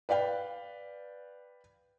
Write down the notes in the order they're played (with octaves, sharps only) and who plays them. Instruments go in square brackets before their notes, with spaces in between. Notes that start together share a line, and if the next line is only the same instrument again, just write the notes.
[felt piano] B4 D5 F5 G5